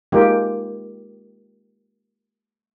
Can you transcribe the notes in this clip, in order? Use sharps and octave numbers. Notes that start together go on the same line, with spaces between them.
G#3 A#3 D#4 F4 G4